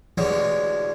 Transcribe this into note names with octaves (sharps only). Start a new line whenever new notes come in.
A1 B2 D3 E3 G#3 C#5